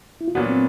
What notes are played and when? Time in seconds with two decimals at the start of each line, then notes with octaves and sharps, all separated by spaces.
0.21 E4
0.28 F4
0.35 A#2 F#3 B3 D4 F#4
0.49 C4